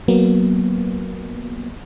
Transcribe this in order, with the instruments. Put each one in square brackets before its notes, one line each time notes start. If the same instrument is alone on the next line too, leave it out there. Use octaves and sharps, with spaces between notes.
[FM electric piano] F#3 A#3 B3